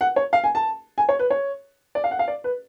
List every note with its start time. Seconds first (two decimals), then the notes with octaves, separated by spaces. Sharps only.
0.01 F#5
0.16 C#5
0.33 F5
0.44 G#5
0.55 A5
0.98 G#5
1.09 C#5
1.19 B4
1.30 C#5
1.95 D5
2.04 F5
2.11 F#5
2.19 F5
2.28 D5
2.44 B4